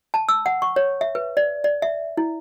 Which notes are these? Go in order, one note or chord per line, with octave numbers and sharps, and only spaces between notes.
A5
E6
F#5
C#6
C#5
E5
B4
D5
D5
E5
E4